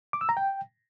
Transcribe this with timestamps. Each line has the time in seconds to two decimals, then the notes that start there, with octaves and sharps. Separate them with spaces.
0.13 D6
0.21 E6
0.29 A#5
0.37 G5